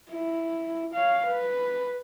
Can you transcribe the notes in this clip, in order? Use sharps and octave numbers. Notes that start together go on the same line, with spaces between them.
E4
C#5 F5
B4